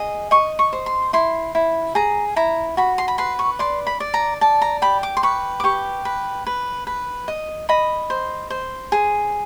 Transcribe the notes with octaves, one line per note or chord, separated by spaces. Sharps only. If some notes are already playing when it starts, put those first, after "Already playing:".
Already playing: G#4 D#5
D#5 C#6
C#6
C5
C6
E4 C6
E4
G#4 A#5
E4 A#5
F#4 B5
C6
B5
B4 C6
C#6
D5 C6
B5
D5
A#5
D5 A5
A#5
G4 B5
D6
C6
B4 C#6
D6
G4 C#6
B4
B4
B4
D#5
D#5 B5
C5
C5
G#4